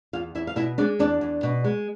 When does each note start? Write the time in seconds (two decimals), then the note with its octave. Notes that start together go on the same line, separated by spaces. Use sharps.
0.13 E2 F4 F5
0.35 E2 E4 E5
0.47 F5
0.56 B2 E4 E5
0.78 G#3 D4 D5
0.99 E2 D4 D5
1.21 E2
1.43 B2
1.64 G#3